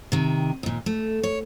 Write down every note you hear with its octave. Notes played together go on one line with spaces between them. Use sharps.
C3 D#3
D#2 A#2
A3
C#5